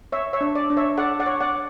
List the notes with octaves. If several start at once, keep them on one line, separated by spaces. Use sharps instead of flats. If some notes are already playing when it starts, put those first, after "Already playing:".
C#5 E5
C#5 E5
D4
D5
D4
C#5 E5
A4 D5 F#5
D5 F#5
C#5
D5 F#5